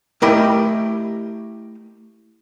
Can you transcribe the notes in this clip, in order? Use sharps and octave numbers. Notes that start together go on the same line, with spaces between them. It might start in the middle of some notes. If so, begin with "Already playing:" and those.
A3 E4 G4 A#4 D#5 B5